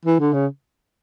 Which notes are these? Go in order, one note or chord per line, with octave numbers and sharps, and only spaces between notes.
E3
D3
C#3